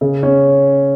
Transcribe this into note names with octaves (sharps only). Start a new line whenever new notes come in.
C#3
C#4